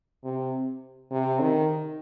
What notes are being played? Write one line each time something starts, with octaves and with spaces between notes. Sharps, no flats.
C3
C3
D#3